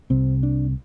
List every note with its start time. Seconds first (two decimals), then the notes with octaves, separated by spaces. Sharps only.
0.10 C2 C3 C4
0.43 D4